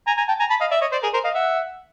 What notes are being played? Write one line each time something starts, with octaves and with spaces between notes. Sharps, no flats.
G#5 A#5
G#5 A#5
G5 A5
G#5 A#5
A5 B5
D#5 F5
D5 E5
C#5 D#5
C5 D5
G#4 A#4
A#4 C5
D#5 F5
E5 F#5